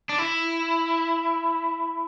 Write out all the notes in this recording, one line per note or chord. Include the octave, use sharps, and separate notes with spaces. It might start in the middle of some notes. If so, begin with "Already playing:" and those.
D4
E4